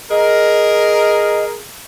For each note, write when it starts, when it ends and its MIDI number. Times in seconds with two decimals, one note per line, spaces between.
0.11 1.63 68
0.11 1.53 70
0.11 1.44 75